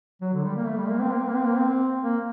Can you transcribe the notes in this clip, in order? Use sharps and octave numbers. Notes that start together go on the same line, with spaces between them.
F#3
D3
G3
A#3
A3
G3
A#3
C4
A#3
C4
A#3
C4
A#3
C4
A#3